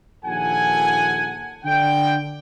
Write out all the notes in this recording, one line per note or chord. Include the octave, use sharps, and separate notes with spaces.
A#1 D#2 F4 A4 F#5 G#5
D3 G5